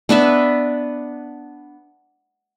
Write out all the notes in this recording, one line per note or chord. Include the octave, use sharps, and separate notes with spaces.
B3 D4 B4 E5